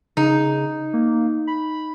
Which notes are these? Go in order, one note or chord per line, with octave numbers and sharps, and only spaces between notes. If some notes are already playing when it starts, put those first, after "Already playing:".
C#3 D#4
A#3
B5